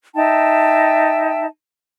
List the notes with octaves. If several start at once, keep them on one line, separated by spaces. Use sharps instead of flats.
D#4 E5 G5 A5